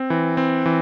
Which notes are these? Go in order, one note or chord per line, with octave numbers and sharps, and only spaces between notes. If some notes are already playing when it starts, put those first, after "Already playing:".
Already playing: C4
E3
C4
E3